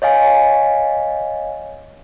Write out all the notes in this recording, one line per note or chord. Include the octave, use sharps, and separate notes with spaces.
C#5 D#5 F5 G#5